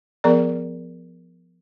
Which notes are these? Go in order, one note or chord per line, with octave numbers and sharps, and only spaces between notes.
F3 B3 G#4 A#4 D5 A#5